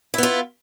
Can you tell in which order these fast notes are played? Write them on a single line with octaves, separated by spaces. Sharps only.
E4 B3 F4